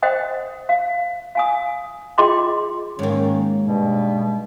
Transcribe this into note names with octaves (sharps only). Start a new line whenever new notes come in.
C5 D#5 F#5 G5 D#6
F5
F5 G#5 D#6
F4 G#4 D#5 G5 C6 D6
G#2 D#3 A#3 C#4
G2 B2